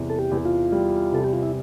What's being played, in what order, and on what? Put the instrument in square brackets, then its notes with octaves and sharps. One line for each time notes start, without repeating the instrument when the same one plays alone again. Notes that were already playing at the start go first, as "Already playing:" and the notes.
Already playing: [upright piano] E2 C3 G3
[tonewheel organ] A4
G4
[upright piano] E2
[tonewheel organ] F4
[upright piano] G3
[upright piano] C3 [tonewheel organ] A4
[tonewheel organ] G4
F4
E4